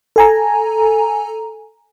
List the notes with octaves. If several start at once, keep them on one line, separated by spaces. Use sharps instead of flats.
A4 G#5 A#5